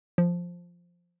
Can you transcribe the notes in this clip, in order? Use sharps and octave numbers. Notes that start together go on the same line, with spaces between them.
F3